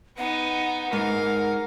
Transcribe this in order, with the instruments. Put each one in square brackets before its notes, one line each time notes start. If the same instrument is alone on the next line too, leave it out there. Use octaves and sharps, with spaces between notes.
[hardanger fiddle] B3 D#4 [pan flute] F#5
[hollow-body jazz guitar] G#2 [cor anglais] A#4 [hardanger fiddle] F5